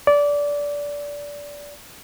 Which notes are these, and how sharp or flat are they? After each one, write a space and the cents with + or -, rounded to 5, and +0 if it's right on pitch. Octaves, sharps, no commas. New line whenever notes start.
D5 -20